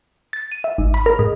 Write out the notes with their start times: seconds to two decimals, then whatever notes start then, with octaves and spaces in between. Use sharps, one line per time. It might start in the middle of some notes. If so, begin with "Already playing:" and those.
0.33 A6
0.52 D#7
0.64 E5
0.78 G#1
0.94 B5
1.06 A#4
1.19 G#2